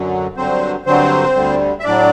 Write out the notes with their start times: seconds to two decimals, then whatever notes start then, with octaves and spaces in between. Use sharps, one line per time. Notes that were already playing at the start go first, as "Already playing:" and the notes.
Already playing: F#2 D3 F#3
0.37 G2 D3 F#3 C4 C5
0.86 G2 D3 F#3 C4 C5
1.35 D2 D3 G3
1.80 E5
1.84 A2 F#3 D4 D5